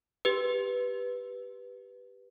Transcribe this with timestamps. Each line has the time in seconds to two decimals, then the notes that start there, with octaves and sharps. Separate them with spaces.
0.25 G4 B4